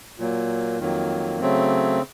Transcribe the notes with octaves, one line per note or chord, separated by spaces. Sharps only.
A#2 F#3 A#3
F2 D#3 F#3 A#3
C#3 F#3 A3 C4